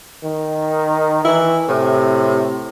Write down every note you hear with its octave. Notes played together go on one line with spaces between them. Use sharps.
D#3
E3 E4
A2 C3